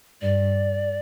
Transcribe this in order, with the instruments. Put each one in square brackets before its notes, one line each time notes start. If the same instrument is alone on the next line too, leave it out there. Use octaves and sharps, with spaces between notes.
[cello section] G2 [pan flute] D5